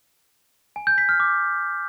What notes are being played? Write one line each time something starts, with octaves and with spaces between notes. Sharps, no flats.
G#5
G6
B6
F6
D6